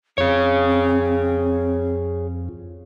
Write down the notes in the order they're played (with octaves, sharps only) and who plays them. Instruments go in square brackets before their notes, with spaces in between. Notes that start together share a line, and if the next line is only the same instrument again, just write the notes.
[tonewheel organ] F2 [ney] C4 [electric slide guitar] G#4 C#5